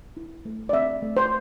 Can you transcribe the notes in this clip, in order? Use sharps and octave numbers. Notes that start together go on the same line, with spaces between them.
E4
A3
D5
C4 E5
A3
C5